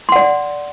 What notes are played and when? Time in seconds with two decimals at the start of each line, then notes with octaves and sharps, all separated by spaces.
0.09 C6
0.12 F#5
0.16 D5